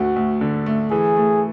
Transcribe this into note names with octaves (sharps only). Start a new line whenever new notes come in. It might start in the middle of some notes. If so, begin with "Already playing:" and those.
Already playing: D2 A3 F#4
D2
D3
A3
E3 G#4
A3